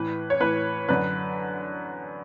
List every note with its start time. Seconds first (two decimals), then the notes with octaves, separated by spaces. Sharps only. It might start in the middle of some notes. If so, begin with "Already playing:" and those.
Already playing: A2 E3 B4
0.30 C#5
0.40 A2 E3 B4
0.89 F#2 D3 B4